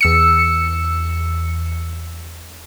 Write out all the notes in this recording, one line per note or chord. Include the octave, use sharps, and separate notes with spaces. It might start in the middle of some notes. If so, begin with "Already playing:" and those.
E2 E6 C#7